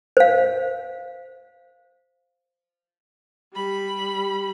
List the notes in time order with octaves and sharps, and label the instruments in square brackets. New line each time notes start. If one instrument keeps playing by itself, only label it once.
[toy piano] C5 F5
[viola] G3 B5